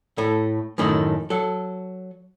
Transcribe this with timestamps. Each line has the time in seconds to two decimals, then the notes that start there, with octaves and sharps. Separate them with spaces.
0.18 A2 A3
0.78 F#2 A2 D#3 A3
1.30 F#3 A4